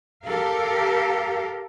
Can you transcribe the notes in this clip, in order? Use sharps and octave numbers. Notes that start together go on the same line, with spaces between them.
G4 A4 A#4 F5